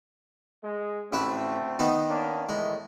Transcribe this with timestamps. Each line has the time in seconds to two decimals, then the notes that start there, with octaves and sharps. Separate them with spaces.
0.64 G#3
1.13 A1 D2 A3 C4 E4 B4
1.79 D#3 B3 D#4
2.10 A#3 C#4 D4
2.49 A2 D#3 E3 G#3